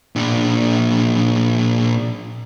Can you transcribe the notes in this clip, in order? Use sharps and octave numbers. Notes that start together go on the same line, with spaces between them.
A#2 D4